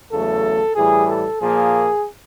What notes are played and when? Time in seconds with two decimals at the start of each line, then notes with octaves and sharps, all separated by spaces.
0.12 E2 C#3 F#3 A3 A4
0.75 A2 E3 G3 G#4
1.08 A4
1.40 A#2 F3 A#3 G#4